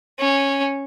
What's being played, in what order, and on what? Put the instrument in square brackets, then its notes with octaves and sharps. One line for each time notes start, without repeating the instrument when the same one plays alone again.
[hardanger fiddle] C#4